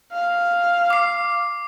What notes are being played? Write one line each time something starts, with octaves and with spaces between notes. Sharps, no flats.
F5
D6 C7